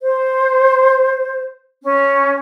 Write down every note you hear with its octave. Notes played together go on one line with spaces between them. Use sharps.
C5
C#4